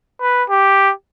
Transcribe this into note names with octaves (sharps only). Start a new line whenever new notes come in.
B4
G4